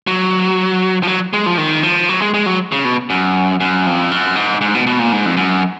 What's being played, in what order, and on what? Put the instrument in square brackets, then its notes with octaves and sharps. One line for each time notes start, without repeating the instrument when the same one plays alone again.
[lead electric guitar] F#3
F3
F#3
G#3
F3
D#3
F3
F#3
G#3
G#3
F#3
C#3
B2
F#2
F#2
F2
F#2
G#2
G#2
B2
B2
A#2
G#2
F2
F#2